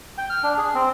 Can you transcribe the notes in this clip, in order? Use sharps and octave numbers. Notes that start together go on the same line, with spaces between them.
G5
F6
D4
G#4
C4